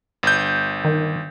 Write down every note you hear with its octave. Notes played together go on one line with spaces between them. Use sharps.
G1 G6
D#3